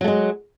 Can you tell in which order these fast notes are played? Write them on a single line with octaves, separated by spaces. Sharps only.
F#3 A3 G#3